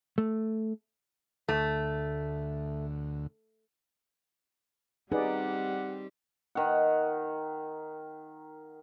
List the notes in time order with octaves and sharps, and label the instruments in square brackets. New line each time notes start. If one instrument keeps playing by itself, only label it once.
[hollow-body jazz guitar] A3
[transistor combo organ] D2 [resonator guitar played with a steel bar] A3
[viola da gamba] G3 C4 G4 [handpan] D#4 [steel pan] G#4 B4 D5 [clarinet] F#5
[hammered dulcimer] D#3 F#5